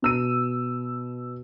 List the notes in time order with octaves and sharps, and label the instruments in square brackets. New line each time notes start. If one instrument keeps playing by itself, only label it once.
[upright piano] B2 E6 D#7